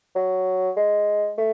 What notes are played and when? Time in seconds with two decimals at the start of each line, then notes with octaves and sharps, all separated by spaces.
0.16 F#3
0.77 G#3
1.38 A3